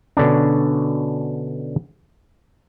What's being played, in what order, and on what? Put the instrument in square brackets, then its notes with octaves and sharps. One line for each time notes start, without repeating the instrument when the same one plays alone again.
[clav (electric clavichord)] B2 D3 C#4 D4